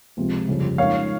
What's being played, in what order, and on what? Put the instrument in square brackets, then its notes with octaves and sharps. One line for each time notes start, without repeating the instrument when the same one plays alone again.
[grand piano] C#2 C3 F3 C4 F4
G1 F2 C#3 G3 C#4
[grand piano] G#2 F3 A#3 C#4 [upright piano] C#5 F5